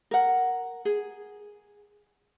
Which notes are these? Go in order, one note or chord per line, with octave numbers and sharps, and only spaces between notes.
A#4 F#5
G#4